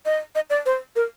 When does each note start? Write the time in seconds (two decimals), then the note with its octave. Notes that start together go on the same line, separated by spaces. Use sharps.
0.06 D#5
0.35 D#5
0.50 D5
0.66 C5
0.96 A#4